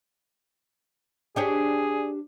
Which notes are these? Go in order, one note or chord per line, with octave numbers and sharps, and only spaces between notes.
D4 G4 G#4 C#5